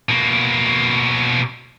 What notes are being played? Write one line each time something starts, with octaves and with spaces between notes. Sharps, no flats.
B2 A#3